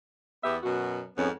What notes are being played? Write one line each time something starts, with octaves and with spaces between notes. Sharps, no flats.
E2 B3 G4 E5
F#2 B2 F#4
F2 G#2 B3 C#4